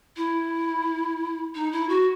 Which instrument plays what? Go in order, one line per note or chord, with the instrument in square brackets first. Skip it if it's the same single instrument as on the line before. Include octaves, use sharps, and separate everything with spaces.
[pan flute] E4
D#4
E4
F#4